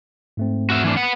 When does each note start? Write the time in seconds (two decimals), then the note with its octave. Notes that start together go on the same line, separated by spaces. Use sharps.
0.37 G#2 A3 C4
0.70 F#4 E5
0.84 E3 D4
0.97 B3 F#5